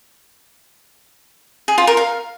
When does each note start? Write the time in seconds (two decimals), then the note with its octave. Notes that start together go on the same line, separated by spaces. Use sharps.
1.68 G#4
1.78 F4
1.87 A#4
1.97 F5